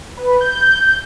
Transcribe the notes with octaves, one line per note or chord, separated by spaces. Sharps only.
B4
G6